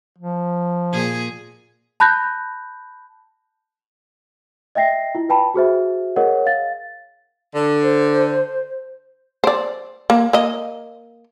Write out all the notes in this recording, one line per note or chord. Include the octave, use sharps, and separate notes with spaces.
F3
A#2 G#4
A5 B5 F#6 G6 A#6
D#5 E5 G5 A#6 C7
E4 F4
B4 G5 A5 B5
F#4 G#4 C5 E5
G#4 A#4 C#5 D#5 F#5
F5 A6
D3
C5
C5 D5
A#3
A#3 D#5